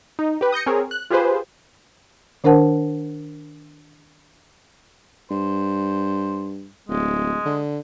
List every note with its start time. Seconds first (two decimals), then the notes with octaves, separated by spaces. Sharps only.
0.19 D#4
0.41 G4 B4
0.52 D#6 G6 A#6 C#7
0.66 C4 G#4 A#4 C#5
0.91 F#6
1.10 F4 G4 G#4 B4 C5
2.44 D#3 D4 A#4 C5 F#5 A5
5.31 G2 C5
6.89 D1 G#3
7.45 D3